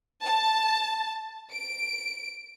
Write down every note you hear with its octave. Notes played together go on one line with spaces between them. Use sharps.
A5
D7